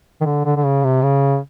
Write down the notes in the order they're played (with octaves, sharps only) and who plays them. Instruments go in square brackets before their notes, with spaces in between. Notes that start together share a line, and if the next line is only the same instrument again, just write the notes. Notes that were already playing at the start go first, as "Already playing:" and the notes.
[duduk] D#3
D3
D3
D3
C#3
C3
C#3